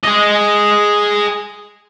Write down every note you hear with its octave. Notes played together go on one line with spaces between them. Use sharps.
G#4 D#5